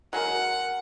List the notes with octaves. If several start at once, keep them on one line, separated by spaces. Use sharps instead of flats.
F#3 G#3 A#4 F#5